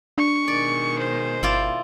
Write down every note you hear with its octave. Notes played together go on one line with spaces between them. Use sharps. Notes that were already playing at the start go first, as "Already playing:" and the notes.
D4 C#6
B2 D#3 G#3 D5
C5
G1 E4 F4 D5